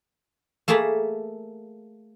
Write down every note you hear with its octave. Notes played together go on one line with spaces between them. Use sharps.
A3 A#3 G#4 A5 B5